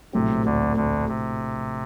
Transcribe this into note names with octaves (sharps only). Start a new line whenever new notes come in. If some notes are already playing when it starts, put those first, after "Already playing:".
A#1 A2 C3 F#3 A3 C4
D2 D3
D2 D3
C3